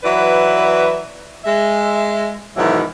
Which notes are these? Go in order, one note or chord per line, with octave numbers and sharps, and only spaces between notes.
E3 F#3 F#4 B4 D5 E5
G#3 E5
G#2 B2 D#3 E3 F#3 E4